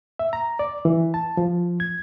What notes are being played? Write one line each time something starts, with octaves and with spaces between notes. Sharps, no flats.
E5
A#5
D5
E3
A5
F3
G#6